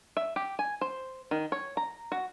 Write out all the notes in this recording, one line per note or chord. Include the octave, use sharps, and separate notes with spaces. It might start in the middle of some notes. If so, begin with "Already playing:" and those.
E5
G4
G#5
C5
D#3
C#5
A#5
F#4